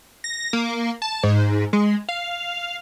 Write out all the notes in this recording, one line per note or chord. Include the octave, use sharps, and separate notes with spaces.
A#6
A#3
A5
G#2
G#3
F5